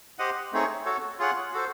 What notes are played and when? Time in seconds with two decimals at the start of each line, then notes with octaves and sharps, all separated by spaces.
0.19 G4 C5 D#5 F#5
0.53 A3 C4 D#4 G#4 C#5
0.86 F#4 A4 C#5
1.19 F4 G#4 C#5 F#5
1.53 F#4 A4 C5